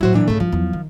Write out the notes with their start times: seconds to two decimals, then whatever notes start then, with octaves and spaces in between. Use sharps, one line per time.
0.01 A2 F#3 E4 F#4 C5
0.13 A#2 E3 D4
0.28 G#2 C#3 A3
0.40 G2 F3
0.52 E2 F#3
0.73 D#3